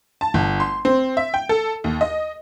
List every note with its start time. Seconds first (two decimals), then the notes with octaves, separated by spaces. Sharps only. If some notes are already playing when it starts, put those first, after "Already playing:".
0.21 A5
0.34 G1
0.60 C6
0.85 C4
1.17 E5
1.34 G5
1.49 A4
1.84 D#2
2.01 D#5